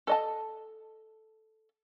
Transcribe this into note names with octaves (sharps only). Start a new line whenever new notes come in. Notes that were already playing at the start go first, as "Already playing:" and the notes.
A4 D#5 A5